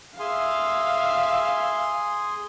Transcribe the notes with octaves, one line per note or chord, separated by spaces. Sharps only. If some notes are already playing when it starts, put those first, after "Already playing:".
G#4 E5 F5 G#5 C6